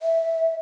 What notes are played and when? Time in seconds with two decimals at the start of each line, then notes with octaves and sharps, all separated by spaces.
0.01 E5